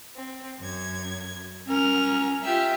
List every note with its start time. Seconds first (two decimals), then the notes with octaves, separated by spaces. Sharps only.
0.16 C4
0.59 F#2 G#6
1.67 C#4 A#4 F6
2.43 F4 G4 E5